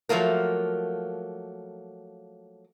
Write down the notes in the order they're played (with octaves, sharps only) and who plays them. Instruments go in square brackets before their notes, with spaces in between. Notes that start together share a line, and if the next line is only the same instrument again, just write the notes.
[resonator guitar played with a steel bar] F3 F#3 A3 A#3 A#4